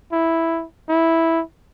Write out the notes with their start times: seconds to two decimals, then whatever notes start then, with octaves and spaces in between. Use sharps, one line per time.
0.12 E4
0.89 E4